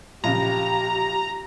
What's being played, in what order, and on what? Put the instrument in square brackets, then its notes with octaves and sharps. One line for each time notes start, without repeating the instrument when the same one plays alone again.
[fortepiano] A#1 C#3 [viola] G4 [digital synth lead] A#5